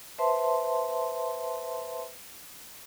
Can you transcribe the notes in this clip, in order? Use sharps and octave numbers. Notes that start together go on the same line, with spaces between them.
B4 C5 E5 A5 C6